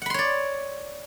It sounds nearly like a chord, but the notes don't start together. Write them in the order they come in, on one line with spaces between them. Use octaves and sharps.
F#5 B5 C6 C#5 D5